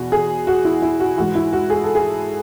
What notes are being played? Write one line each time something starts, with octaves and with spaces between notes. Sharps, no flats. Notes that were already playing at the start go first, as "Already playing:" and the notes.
Already playing: E2 B2 F#4
G#4
F#4
E4
E4
F#4
G#2 E3 F#4
E4
F#4
G#4
A4
G#4